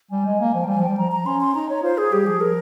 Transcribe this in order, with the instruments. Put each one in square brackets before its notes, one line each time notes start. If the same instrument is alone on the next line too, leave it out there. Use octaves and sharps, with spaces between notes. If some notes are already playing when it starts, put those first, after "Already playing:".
[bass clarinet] G3 [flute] G#5
[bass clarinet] G#3
A#3
F3
[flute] G5
[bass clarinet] G3 [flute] G#5
[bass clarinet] F3
[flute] G5
[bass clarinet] G3
[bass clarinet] F3 [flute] A#5
[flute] A#5
[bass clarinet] C#4 [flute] C6
[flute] C6
[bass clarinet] D#4 [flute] A#5
[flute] C#5
[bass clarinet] F4 [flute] C5
[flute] G#4
[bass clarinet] G3 [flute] G4
[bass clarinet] F3 [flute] G#4
[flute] A#4